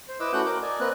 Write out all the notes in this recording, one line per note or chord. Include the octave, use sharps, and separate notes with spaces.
C5
E4 B4 D#5 D6 E6
A3 C#4 F#4 F#5 F#6 G6
A#4 D6
D5 D#5 G#5
A#3 C4 B4 D#5 F#6